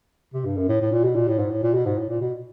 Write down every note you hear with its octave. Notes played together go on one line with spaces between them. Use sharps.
C3
G2
F#2
A2
A2
A#2
B2
A#2
A2
G#2
A2
A#2
B2
G#2
A2
A#2
B2